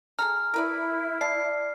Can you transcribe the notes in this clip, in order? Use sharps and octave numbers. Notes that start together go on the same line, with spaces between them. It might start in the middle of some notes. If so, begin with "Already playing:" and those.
G#4 A4 A#5 F6
E4 A#4 B4 D5
D5 A5 C7